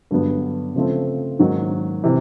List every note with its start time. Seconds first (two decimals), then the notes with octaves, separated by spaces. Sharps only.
0.11 G2 D3 F#3 B3
0.75 C#3 F3 A3 C4
1.39 G#2 D#3 F#3 A#3 C#4
2.04 C3 E3